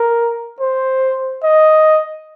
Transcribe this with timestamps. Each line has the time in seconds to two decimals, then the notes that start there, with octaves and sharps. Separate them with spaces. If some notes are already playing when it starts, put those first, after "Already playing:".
Already playing: A#4
0.60 C5
1.43 D#5